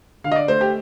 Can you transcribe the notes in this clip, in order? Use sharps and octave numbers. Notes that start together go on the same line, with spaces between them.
D3 F5
D#5
D5
A3 C5
G4